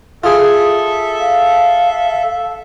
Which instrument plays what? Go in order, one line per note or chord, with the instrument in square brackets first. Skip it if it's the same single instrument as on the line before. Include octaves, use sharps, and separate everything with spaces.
[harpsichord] F4 G#4 [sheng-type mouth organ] A4 E5
[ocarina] F5